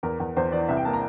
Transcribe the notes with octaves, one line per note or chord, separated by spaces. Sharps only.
E2 A#4
E2
E2 C5
E3 D5
C2 E5
G5
A#3 A5
A#5